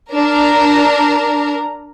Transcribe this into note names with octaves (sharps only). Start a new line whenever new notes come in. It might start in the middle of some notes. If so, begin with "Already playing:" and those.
D4 A#4 A#5